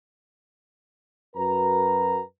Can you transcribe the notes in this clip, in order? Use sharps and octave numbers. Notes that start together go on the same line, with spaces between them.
F#2 F#4 A#4 B4 A#5